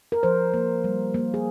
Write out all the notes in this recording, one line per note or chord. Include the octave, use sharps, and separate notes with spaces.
A#4
F3 C5
A#3
G3
A#3
G#4